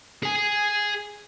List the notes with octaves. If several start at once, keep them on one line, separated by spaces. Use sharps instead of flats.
G#4 G#5